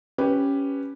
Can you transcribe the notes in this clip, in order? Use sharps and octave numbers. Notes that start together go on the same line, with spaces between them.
C#4 G4 B4